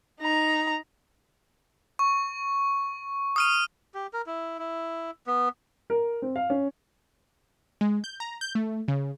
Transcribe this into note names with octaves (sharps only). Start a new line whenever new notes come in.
D#4 A#5
C#6
D#6 F6 D#7
G4
A#4
E4
E4
B3
A#4
C4
F5
C#4
G#3
G6
A#5
G6
A3
C#3